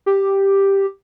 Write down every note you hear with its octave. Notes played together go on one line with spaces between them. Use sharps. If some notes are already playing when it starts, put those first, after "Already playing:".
G4